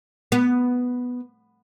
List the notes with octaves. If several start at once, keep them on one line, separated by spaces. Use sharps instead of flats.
B3